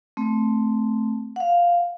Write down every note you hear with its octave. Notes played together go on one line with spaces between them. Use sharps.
A3 C4
F5 F#5